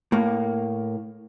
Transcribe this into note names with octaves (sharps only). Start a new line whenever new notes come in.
A2 A#3